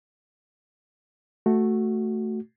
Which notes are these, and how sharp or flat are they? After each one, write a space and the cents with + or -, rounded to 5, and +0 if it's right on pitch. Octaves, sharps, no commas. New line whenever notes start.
A3 +0 F#4 +0